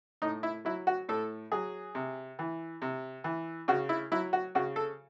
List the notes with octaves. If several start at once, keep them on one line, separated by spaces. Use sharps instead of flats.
A2 D#4
E4
F#3 E4
F#4
A2 A4
F#3 G#4
C3
E3
C3
E3
C#3 F#4
E4
F#3 E4
F#4
C#3 F#4
A4